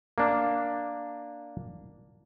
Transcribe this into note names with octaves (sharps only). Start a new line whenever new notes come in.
A#3 D4